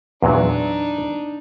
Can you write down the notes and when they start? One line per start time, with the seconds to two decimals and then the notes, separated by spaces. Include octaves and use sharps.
0.22 E2 A#2 F#3 D4 D#4